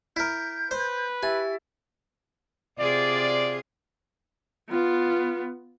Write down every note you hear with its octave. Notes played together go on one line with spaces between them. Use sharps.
E4 A#4 G6
B4 C5
E4 G4 E5 G#5 A6
C3 F4 G#4 D5
B3 F4